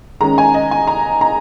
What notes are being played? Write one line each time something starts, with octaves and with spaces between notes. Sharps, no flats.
D#3 G#3 C#4 A#5
G#5
D#5
G#5
A#5
A#5